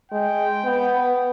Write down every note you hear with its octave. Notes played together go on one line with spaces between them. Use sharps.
G#3 G5
B3